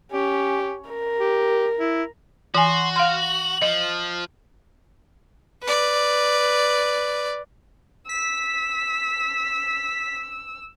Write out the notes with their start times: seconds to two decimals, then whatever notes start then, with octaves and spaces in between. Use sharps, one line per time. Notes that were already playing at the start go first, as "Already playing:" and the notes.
0.12 C#4 G4
0.89 A#4
1.19 G4
1.79 E4
2.55 E3 F#4 G#5 C6
2.96 F5 C6 F6
3.19 F#7
3.62 F3 D#5
5.63 B4 D5
8.09 E6 B6